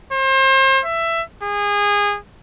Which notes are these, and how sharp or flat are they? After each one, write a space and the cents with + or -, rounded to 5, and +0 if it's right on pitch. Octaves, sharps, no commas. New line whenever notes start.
C5 +35
E5 +15
G#4 -25